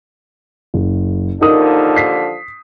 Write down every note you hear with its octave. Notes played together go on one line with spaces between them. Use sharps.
F#1
D#2 D3 F3 D#4 A#4 D#6
B6 C7